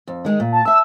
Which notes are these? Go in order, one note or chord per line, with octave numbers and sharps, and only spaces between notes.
F2
D#3 G#3 G#4
A#2
A5
E5 A5 E6